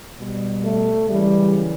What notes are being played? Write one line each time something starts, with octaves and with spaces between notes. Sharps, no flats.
B2 G3
A3
F#2 C#3 E3 G3